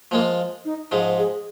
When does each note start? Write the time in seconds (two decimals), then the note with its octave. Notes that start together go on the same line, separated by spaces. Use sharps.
0.11 F3 G#3 A#3 F4
0.65 D#4
0.91 G#2 F3 G#3 G#4
1.19 G#4